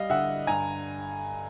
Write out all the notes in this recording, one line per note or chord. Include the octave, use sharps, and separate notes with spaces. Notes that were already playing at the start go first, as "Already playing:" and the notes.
Already playing: G3 D#5 F5
D3 E5 F#5
G2 G#5 A#5